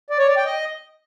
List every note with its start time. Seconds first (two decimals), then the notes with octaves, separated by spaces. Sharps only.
0.10 D5
0.19 C#5
0.28 D5
0.37 G5
0.46 D#5